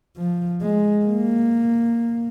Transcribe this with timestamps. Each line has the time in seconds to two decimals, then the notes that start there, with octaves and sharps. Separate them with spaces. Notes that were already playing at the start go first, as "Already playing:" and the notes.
0.17 F3
0.61 G#3
1.05 A#3